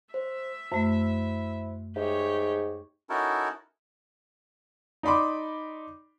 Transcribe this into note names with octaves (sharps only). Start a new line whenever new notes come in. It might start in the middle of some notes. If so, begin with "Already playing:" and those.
C5 E5
F#2 A3 E4 C5
G#2 G4 C#5 E5
C#4 D#4 E4 F#4 A4 A#4
D#4 D5 B5 C6 D6